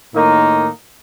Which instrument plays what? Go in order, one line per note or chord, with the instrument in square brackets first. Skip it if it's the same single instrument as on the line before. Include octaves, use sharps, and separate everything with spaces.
[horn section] A2 D#3 A#3 D#4